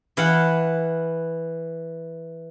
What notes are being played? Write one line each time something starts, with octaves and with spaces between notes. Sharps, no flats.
E3 F5 F#5